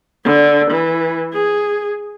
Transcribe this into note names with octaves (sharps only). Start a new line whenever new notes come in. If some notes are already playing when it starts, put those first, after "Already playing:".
D3
E3
G#4